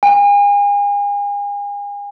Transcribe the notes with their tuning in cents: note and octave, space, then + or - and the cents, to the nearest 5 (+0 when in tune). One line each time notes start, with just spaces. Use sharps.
G#5 -40